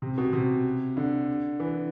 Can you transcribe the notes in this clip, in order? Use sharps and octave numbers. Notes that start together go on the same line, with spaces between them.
C3
B2
C3
D3
E3